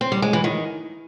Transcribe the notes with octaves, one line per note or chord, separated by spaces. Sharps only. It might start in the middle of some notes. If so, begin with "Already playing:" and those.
C4
G3
G#3
E3
D#3